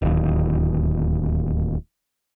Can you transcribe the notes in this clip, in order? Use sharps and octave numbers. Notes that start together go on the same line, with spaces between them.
D1 D#2